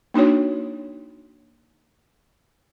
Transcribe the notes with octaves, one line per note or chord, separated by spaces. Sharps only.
A#3 D4 D#4 F#4 C#5